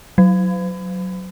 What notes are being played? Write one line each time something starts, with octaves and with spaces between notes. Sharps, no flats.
F#3